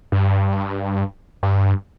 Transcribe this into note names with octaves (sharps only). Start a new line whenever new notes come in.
G2
G2